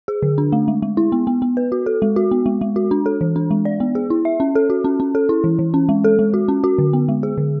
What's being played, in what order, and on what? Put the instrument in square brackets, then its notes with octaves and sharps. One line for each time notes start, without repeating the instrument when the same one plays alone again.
[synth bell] G#4
D3
D4
A3
G#3
G#3
E4
B3
B3
B3
B4
F#4
A4
G#3
F#4
B3
G#3
G#3
F#4
D4
A4
E3
D4
G#3
D5
B3
G#4
E4
E5
C#4
A4
F#4
C#4
C#4
A4
E4
E3
E3
C#4
G#3
A4
G#3
F#4
C#4
F#4
D3
B3
G#3
G#4
D3